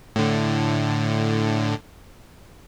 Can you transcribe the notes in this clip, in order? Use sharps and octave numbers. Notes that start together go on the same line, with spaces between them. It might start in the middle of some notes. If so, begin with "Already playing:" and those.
A2 D3